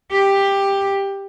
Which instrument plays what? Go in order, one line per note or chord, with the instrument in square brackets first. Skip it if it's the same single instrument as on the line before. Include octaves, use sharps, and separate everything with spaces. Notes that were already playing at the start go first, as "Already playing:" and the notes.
[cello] G4